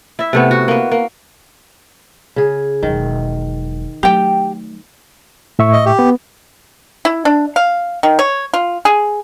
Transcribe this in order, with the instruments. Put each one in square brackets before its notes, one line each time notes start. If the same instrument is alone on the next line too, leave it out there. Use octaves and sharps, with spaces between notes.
[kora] E4 E5
C3 A3 B3
F#4
A#3 B3
A#3
C#3 G#4
[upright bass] E1 F#3 [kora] D#3
[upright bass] F#3 A3 [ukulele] G4 G5
[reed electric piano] A2 E5 C#6
[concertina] D#5
G4
[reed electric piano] B3
[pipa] E4
D4
F5
D#3
C#5
F4
G#4